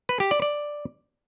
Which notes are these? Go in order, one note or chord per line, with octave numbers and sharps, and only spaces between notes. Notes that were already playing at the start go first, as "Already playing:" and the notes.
B4
G4
D5
D5